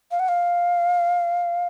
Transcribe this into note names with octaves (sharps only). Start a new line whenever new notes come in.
F5
F#5
F5